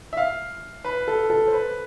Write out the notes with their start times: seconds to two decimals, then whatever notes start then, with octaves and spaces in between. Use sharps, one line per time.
0.13 E5
0.17 F5
0.84 B4
1.08 A4
1.30 A4
1.48 C5
1.53 B4